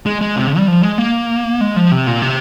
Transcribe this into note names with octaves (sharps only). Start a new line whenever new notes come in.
G#3
G#3
C3
C#3
G3
F3
G#3
A#3
G#3
F3
C3
A#2
C3